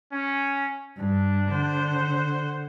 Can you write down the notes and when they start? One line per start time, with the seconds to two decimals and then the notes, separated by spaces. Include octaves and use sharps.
0.13 C#4
0.97 G2 D4
1.51 D3 C5 F#5